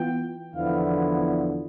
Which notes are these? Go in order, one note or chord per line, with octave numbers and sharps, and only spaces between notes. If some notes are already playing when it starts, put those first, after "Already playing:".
Already playing: E3 B3 F4 G5
E2 D3 F3 B3 E4 F5